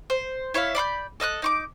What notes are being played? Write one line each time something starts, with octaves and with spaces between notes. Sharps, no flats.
C5
E4 C#5 E5 F5
D5 B5 C6 G6
A4 D#5 E6 F#6
D#4 C#6 D6